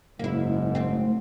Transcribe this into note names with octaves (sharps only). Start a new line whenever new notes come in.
F#1 G#2 A#3 E4
A3 C4